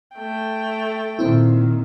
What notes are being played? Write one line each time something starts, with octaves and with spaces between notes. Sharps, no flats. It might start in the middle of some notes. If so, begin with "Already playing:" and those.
A3 G5
A#2 D#3 C4 E4